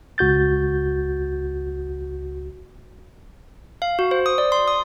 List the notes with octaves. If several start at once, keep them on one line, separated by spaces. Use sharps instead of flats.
C#2 F#4 G6 A6
F5
F#4
C5
D#6
D5
C6
D#6